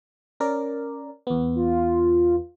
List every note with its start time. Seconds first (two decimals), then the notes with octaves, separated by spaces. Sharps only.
0.40 C#4 A#4 D5
1.27 E2 B3
1.55 F4